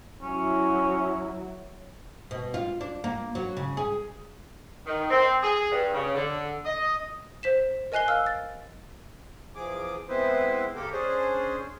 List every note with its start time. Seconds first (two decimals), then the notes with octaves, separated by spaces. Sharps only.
0.22 F#3 C#4 E4
2.31 B2
2.54 F4
2.81 D4
3.04 A#3
3.35 F#3
3.57 C#3
3.77 G#4
4.86 D#3
5.10 C4
5.42 G#4
5.71 G2
5.93 C#3
6.15 D3
6.65 D#5
7.43 C5 B6 E7
7.92 A#4 D#5 G#5 F#6 C7 G7
8.08 F5 E6 F6
8.26 A6
9.55 E2 F3 G#4 D6
10.09 G#3 B3 C4 E4 B4 C5
10.76 C#3 A#3 G4 A4 A#4
10.92 C#4 D4 G#4 C5